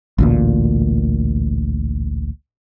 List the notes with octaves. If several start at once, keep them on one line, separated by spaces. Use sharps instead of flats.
A1 D2 A#2